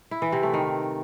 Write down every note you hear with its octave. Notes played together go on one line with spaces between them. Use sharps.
E4
E3
C3
A3
D#3